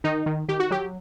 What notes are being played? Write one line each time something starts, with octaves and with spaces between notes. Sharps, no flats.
D#3 D#4
D#3
D#3 G4
F#4
F#3 G4